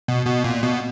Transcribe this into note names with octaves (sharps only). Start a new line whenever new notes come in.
B2
B2
A#2
B2